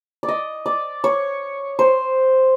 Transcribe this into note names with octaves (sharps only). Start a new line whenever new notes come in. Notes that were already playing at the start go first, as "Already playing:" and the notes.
D5
D#5
D5
C#5
C5